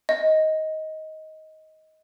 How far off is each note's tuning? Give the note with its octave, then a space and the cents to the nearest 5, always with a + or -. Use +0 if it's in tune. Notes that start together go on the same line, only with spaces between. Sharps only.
D#5 +15